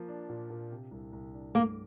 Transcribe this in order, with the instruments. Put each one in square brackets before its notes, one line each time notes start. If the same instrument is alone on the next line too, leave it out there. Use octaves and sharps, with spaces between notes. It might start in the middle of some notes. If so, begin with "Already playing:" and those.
Already playing: [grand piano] F3 A#3
D4
A#2
A#2
C3
C2
C2
D4
[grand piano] G2 [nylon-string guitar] A#3